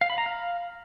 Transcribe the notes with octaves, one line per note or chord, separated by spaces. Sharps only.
F5
B5
A#5
F5